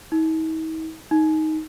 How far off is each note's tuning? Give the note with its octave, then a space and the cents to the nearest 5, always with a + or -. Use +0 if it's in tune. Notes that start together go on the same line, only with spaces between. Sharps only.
D#4 +45
D#4 +10